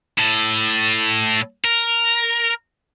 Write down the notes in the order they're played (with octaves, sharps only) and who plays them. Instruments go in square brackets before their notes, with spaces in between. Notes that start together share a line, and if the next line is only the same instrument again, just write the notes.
[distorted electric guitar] A2 A4
A#4